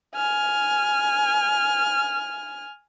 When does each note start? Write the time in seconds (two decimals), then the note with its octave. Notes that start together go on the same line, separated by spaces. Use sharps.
0.15 G#5 F6